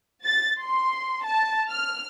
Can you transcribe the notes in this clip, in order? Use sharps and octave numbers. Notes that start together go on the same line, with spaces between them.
A6
C6
A5
F6